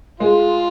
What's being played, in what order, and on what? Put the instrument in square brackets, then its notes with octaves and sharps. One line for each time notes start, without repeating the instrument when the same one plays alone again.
[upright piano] G#3 [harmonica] F4